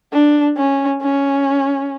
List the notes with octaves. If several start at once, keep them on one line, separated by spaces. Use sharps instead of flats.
D4
C#4
C#4